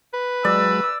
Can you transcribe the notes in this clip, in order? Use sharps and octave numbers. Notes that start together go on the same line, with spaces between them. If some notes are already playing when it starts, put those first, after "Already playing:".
B4
F#3 G#3 D5 E6